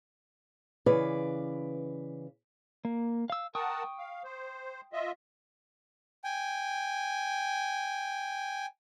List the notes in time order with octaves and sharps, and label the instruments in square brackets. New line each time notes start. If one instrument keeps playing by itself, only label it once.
[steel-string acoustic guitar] C#3 E3 B4 D5
[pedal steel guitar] A#3
F5 E6
[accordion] A#4 F#5 A5 [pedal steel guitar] G5 C#6 D#6
[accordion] F5
C5
F4 D#5 E5
[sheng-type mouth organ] G5 G#5